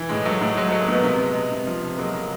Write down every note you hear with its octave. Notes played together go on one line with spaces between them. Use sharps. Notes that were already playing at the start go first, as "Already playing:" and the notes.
Already playing: E3
A2 G#3
F#3 A3
A2 G#3
F#3 G#3
F#3 A3
G#3 A#3
B2 A3 B3
C3
G#3
G#3
C3
F3
C3
F#3 G#3 A#3
C#3